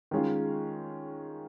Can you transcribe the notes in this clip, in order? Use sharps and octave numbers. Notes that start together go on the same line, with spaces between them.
D#3 G#3 C#4 F4